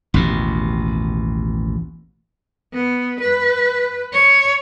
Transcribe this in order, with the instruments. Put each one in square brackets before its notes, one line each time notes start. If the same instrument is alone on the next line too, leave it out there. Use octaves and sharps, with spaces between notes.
[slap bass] A1 D#2 B2
[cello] B3
B4
C#5